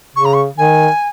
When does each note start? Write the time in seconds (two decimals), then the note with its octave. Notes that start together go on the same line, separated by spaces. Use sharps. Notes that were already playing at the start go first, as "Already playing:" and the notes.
0.16 C#3 C#6
0.25 A#5
0.33 C#6
0.57 D#3 G#5